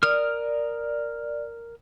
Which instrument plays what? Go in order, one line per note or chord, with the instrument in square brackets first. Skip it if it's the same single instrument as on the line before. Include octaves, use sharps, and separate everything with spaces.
[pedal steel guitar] A#4 D#6 F6 [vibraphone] D5